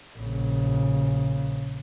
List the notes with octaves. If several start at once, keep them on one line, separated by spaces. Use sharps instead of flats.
A#1 C#3